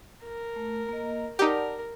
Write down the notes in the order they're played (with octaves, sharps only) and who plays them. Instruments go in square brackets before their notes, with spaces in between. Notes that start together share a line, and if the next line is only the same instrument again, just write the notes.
[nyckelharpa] A#4
[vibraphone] A3
A#3 D#5
[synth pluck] D#4 G4 [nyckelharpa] A#4 [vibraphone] D5 F#5 A5